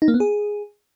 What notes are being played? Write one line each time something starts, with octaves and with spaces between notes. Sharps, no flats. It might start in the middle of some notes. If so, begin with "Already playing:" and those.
D#4
A#3
B3
G#4